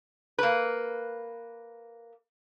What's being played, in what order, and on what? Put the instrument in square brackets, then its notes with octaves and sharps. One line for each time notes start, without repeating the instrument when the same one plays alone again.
[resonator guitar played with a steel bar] A#3 B4